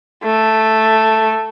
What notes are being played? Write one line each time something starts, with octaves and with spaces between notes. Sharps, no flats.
A3